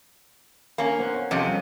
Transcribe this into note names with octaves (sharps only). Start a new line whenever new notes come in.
A#3 C#4
B3 C5 F#5
C#5
C3 F3 C#4 A4 D#5
G3 C#4 C#5